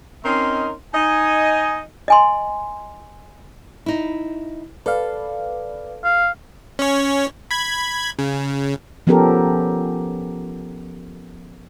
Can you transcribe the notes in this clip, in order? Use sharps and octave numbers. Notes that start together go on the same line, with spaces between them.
C4 C#4 D#4 A#4 D#5 C6
D#4 D#5 G#5
D#5 G#5 C6
D#4 E4
A4 B4 D5 F5
F5
C#4 C#5
B5 G#6
C#3
F3 B3 C#4 G4 A4 A#4